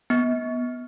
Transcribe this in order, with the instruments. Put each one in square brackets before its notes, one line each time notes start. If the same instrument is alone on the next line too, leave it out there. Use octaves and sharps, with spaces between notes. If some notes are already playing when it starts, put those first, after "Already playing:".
[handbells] B3